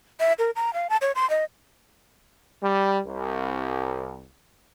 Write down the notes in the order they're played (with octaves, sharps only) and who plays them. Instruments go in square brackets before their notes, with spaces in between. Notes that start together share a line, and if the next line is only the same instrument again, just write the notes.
[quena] E5
A#4
A#5
F5
A5
C#5
C6
D#5
[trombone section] G3
C2